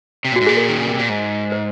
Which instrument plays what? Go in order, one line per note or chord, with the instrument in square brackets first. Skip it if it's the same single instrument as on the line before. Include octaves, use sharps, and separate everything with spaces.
[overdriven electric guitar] C3
A#2
[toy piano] F#4
[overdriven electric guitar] G#2
[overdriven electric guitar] A#2 [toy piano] G#4
[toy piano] A#4
[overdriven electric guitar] D#3
C#3
C3
A#2
G#2
[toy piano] C5